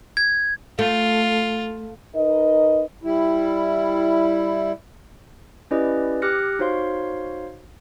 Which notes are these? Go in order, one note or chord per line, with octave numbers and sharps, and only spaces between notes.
G#6
A3 F4
D#4 A#4 B4 D#5
G3 E4
C#4 E4 G4 B4 D5 D#5
G4 D6 F6 F#6 A#6 C#7
D#4 F#4 C5 C#5 F5 C6